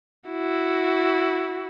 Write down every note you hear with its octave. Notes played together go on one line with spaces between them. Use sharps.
E4 F#4